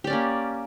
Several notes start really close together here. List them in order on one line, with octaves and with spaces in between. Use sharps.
G4 D5 C#4 A#3